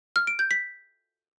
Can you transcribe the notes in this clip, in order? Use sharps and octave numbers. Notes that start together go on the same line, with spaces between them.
F6
D7
G6
B6